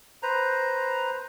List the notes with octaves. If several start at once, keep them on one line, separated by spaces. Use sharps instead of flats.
B4 C5 A#5